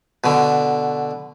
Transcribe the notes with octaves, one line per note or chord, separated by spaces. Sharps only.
B2 D3